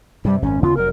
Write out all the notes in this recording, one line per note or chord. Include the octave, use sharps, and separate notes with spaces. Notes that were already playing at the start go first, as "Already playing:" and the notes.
G2 C3 G3
G#1 F#2 C#4
D#2 C#3 B3 F4
F1 F#3 A#4